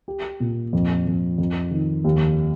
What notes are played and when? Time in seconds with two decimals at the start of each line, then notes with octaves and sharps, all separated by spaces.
0.08 G4
0.40 A#2
0.73 F2
1.07 F2
1.38 F2
1.71 D#3
2.04 D#2